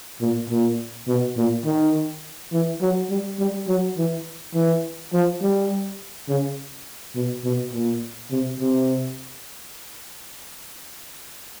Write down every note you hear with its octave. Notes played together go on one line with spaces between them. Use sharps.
A#2
A#2
B2
A#2
D#3
E3
F#3
G3
G3
F#3
E3
E3
F3
G3
C#3
B2
B2
A#2
C3
C3